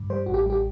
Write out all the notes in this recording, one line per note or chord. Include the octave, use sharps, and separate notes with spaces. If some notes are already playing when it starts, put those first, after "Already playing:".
Already playing: G2
G3 C5
A1 F#4
G4
G3 G4